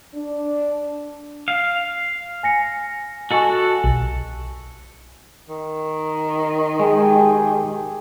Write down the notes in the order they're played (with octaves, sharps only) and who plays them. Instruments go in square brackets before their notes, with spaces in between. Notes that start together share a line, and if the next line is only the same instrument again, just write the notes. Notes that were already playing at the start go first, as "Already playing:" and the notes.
[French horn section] D4
[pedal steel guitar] F5
[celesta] G#5 A#6 C#7
[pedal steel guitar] F#4 A4 [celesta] D#5 G#5 C#6
[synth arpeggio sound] B1
[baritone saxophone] D#3
[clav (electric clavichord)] G#3 [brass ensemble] G4 G#4 G5